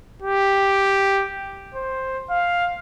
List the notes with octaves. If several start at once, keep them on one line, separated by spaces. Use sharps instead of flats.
G4
C5
F5